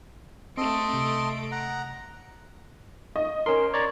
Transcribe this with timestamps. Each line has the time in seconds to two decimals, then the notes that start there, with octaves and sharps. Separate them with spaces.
0.57 A3 C4 A4 D#5 C6 D7
0.93 C3
1.52 F#5 A#5
3.16 D#5
3.46 C#4 A#4 C6
3.74 C#5 D5 A#5